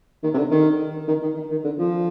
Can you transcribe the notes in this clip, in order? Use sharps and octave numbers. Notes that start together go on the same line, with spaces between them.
D#3
C3
D3
D#3
D#3
D#3
D#3
D#3
D3
F3